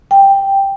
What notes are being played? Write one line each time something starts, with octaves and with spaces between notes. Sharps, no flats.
G5